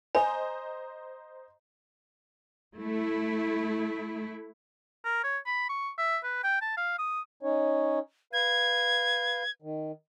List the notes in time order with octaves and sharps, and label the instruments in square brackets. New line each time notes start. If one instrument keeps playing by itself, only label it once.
[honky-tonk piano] C5 D#5 A#5 [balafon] G#5
[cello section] A3 E4
[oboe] A#4
C#5
B5
C#6
E5
B4
G5
A5
F5
D#6
[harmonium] C#4 D#4 C#5
[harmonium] B4 F5 [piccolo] G#6
[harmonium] D#3